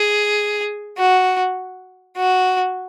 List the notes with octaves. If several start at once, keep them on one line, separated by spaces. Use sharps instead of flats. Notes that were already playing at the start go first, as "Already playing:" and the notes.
Already playing: G#4
F#4
F#4